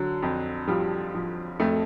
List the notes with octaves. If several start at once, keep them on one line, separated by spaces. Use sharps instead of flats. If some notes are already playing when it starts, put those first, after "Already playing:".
Already playing: D3 F#3
F2
F3 G3
F3
F2 A3